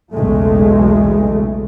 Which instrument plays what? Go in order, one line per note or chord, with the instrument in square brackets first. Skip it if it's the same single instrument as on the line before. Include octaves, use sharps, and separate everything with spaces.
[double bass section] B1 E2 C#3 G#3 A3